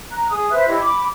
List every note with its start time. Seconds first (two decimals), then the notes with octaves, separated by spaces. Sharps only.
0.10 A#5 F#6
0.29 G#4 D#6
0.51 B4 C5 E5 F#6
0.68 E4 G4 C#5 D#5
0.80 B5 D6